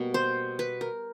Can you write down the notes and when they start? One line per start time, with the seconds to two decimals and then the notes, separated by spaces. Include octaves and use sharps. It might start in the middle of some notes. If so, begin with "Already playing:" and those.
Already playing: B2 G3 A#3
0.14 C5
0.59 B4
0.81 A#4